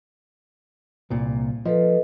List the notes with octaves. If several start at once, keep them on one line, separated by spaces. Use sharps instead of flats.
C2 A#2
F3 A4 B4 D#5